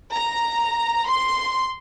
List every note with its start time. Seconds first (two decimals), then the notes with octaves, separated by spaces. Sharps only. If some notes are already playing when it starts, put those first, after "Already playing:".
0.11 A#5
1.09 C6